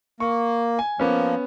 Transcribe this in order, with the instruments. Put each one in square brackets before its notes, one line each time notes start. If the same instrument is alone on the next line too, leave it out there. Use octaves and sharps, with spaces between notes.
[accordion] A#3 [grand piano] C#6
[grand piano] G#5
[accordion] F3 A#3 [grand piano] B3 C#4